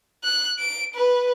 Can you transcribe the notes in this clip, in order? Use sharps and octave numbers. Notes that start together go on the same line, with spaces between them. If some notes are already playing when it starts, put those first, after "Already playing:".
F#6
D7
B4